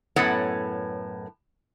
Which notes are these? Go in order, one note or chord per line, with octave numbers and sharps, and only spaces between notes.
F#2 A2 B3 B4 C#5 F#5